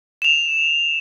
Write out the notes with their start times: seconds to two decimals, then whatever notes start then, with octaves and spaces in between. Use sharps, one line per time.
0.22 E7 F7